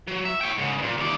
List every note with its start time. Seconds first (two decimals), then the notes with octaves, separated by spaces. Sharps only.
0.07 F#3
0.25 E5
0.41 C#5 G5
0.58 G#2 C#3
0.78 G2 A#2
0.97 D#2 D5